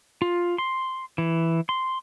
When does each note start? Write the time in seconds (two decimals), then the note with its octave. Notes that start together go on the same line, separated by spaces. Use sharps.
0.22 F4
0.58 C6
1.18 E3
1.69 C6